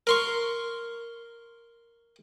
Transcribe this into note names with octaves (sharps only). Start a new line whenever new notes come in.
A#4 C6 C#6